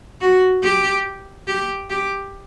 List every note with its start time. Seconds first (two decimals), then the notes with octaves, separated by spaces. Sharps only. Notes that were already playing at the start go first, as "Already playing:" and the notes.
0.21 F#4
0.63 G4
1.48 G4
1.90 G4